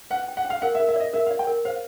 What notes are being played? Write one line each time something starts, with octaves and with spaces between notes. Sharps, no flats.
B4 F#5
G5
F#5
G5
F5
A#4 F#5
E5
A#4
E5
D5 D#5
A#4 E5
F5
D5
G5
A#4
C5 F5